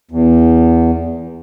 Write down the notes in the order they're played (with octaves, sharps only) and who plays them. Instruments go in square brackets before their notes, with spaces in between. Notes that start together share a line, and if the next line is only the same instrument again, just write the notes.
[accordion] E2